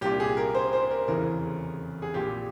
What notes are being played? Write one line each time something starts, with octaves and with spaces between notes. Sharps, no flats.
C2 A#2 G4
G#4
A#4
C5
C5
A#4
F1 E2 C#3 E3 A#4
G#4
A#1 A#2 G4